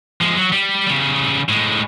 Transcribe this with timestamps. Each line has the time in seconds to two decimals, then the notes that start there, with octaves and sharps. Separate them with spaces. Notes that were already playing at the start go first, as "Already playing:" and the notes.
0.21 F3 G#3
0.38 F#3
0.52 G3
0.87 C#3 G3
1.49 A2 G#3